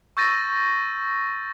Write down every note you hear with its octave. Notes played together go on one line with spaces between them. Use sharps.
C#6 E6 G6 A6 A#6 D#7